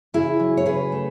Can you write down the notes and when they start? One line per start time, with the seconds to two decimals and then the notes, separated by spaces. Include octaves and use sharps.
0.14 C#3 E4 G#4
0.40 F#3
0.57 C#5
0.66 C#3 G#4 B4
0.92 A3